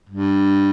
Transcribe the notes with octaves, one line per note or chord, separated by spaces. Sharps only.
G2